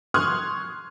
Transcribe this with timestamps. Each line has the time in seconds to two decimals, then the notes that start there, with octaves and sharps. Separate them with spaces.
0.14 C6 C#6 D#6 F6 F#6 G#6